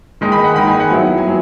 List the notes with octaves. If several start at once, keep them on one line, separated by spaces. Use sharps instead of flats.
D#3 G#3 D#4
B5
F#5
D#3 G#3 D#4 B5
G#5
F#5
F#3 B3 E4
G#5
F#3